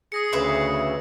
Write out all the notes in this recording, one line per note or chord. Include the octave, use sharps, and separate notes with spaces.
G#4 D#6 A#6 C#7
D2 C#3 B4 E5 C6